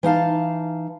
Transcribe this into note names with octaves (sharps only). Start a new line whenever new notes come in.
E3 D#4 F5 A5